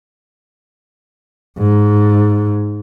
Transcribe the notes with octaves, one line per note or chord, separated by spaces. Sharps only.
G#2